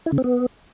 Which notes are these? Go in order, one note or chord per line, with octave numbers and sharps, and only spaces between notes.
E4
C#3
C4
B3